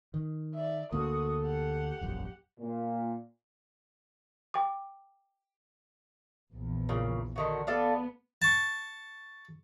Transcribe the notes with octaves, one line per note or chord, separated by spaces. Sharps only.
D#3
D5 E5
D2 A#3 D4 F#4 A4 D#6
G4 F#5
E1 A#1 F#2
A#2
G5 D6
A#1 E2
A#2 C#3
D3 D#3 F#4
B3 A4 D5 F5
A5 C#6